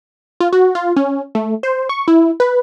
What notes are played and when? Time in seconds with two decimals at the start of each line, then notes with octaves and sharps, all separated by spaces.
0.40 F4
0.53 F#4
0.75 F4
0.96 C#4
1.35 A3
1.63 C5
1.89 C#6
2.08 E4
2.40 B4